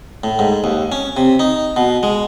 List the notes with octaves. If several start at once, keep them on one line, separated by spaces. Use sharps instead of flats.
A2
G#2
D#2
C#4
C3
D#4
B2
G#3